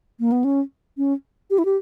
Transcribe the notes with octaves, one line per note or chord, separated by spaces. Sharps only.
A#3
B3
C#4
C#4
G4
E4
G4